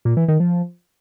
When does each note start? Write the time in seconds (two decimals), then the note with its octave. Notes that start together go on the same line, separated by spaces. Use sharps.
0.05 A#2
0.17 E3
0.28 D#3
0.40 F3